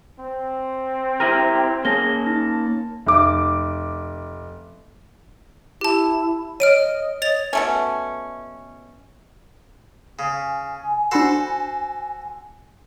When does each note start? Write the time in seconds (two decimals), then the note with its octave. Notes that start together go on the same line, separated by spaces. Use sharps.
0.20 C4
1.20 E4 G4 A#4 A#6 D#7
1.85 A#3 C#4 G#4 A5 A#6 G7
2.26 D#4 A5 A#6
3.06 F1 D6
5.81 E4 G4 A5
6.60 C#5 D#5 F6 D7 D#7
7.22 C#5 D#5 A6 F7
7.53 B2 A3 C#4
10.19 C#3 G#5
11.11 D4 F#4 A4 C5 B5 E7